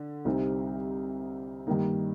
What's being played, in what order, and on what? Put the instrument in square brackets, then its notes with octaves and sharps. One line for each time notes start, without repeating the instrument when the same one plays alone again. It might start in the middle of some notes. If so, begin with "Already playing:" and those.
Already playing: [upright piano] D3
C2 C3 G3 C4 D#4
G2 D#3 G3 A#3 D#4